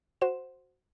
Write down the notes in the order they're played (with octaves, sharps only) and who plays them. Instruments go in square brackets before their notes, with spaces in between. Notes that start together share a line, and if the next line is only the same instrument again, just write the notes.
[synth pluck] F#4 C5 E7